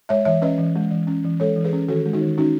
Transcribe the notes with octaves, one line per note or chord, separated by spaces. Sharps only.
G#3 C#5 E5
E3 C#5 E5
C#4 B4 D#5
E3
G#3
E3
C#4
E3
G#3 A4 C#5
E3
G#4 B4
C#4
D#3 F#4 A4
G#3
D#4 F#4
D#3
C#4 D#4 F#4